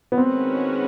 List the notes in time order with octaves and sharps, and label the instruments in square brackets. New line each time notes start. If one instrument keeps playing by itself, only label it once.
[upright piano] B3
[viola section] D#3 G#3 C#4 F#4 B4 [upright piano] C4